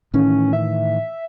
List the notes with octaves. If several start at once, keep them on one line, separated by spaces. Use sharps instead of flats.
A2 D#3 E3 C#4
E5